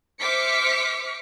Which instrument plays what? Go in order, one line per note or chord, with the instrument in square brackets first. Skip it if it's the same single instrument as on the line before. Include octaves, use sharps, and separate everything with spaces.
[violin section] C5 E5 D6 F6 B6 C#7